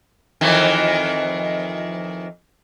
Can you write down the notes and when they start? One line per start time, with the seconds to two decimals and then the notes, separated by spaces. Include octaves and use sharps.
0.41 F2 D#3 E3